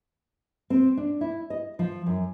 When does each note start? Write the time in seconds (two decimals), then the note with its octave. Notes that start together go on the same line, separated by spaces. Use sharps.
0.70 C4
0.97 D4
1.21 E4
1.50 D#5
1.79 F3
2.06 F#2